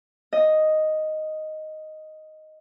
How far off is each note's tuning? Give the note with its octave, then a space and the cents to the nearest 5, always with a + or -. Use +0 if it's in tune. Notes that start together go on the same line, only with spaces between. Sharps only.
D#5 +0